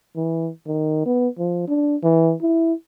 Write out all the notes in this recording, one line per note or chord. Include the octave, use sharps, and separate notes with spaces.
E3
D#3
B3
F3
D4
E3
E4